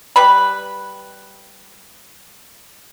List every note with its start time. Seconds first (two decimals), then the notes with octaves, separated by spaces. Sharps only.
0.16 G3 B4 B5